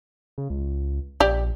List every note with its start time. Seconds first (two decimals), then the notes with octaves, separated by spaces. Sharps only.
0.38 C#3
0.50 C#2
1.20 A#1 G4 D5